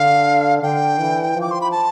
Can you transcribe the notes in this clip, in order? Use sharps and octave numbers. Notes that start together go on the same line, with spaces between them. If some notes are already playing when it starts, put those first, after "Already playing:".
Already playing: D3 F5
D3 G5
E3
F3
D6
C6
B5
A5